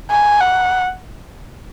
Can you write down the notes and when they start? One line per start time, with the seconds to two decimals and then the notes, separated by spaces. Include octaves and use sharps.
0.11 G#5
0.40 F#5